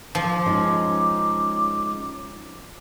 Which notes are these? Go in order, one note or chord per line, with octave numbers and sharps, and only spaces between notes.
F3 D6
G#3 C#4 D#4